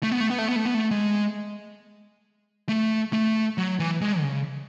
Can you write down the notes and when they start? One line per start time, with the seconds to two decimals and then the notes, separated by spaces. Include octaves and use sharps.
0.03 A3
0.12 B3
0.20 A3
0.30 B3
0.38 A3
0.48 B3
0.56 A3
0.65 B3
0.74 A3
0.91 G#3
2.69 A3
3.13 A3
3.58 F#3
3.80 E3
4.01 G#3
4.19 D3
4.24 C#3